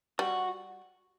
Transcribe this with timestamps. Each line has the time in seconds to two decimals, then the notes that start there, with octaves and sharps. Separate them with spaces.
0.19 G3 F#4